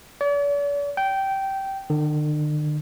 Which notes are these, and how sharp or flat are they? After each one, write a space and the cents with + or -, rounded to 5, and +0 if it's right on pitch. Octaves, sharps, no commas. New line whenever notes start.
D5 -45
G5 -15
D3 +45